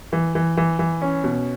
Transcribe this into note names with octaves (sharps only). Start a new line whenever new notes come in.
E3
E3
E3
E3
C#4
B2